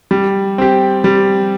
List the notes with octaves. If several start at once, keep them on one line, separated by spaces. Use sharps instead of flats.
G3
C4 G4
G3